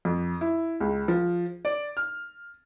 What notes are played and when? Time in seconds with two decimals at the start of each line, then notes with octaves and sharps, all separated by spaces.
0.05 F2
0.41 E4
0.81 C#2
1.08 F3
1.65 D5
1.97 F6